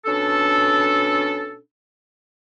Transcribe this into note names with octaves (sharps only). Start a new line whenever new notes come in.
B2 C#4 D4 A4